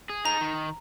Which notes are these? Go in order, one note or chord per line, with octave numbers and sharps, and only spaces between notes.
G#4
D#4 A#5
D#3